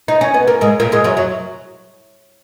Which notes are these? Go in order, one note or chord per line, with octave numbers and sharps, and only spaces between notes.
D#4
C#4
B3
A#3
G#2 G#3
A#2 A#3
G#2 G#3
F#2 F#3
F#3